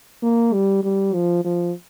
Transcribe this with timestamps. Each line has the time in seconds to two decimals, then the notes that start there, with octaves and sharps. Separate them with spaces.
0.23 A#3
0.53 G3
0.84 G3
1.14 F3
1.44 F3